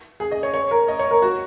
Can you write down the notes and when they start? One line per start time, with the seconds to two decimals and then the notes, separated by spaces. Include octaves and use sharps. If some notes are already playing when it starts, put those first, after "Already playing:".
0.20 G#4
0.32 D#5
0.43 C#5
0.54 C#5
0.71 A#4
0.88 D#5
0.99 C#5
1.11 A#4
1.22 F#4